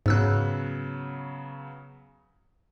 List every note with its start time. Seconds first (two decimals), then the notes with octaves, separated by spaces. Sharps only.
0.06 G#2 C#3 F#3 B3 E6 F#6